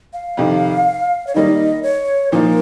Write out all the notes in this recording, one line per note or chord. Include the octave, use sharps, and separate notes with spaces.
F5
F2 C3 D#3
C#5
D#3 G3 A#3 D#4 D#5
C#5
A#2 F3 A#3 D#4 A#4